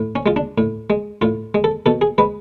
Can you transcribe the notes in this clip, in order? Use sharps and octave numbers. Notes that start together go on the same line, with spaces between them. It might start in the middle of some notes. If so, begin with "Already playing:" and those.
Already playing: A2
C#4
G#3 F4
D4
A2
G#3
A2 F4
G#3
A4
B2 A4
G#4
G#3 B4